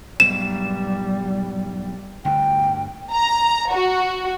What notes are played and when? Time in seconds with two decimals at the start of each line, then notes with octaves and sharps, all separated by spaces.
0.20 B1 G#2 B2 G3 E7
2.25 G1 D2 G2 G5
3.12 A#5
3.71 F#4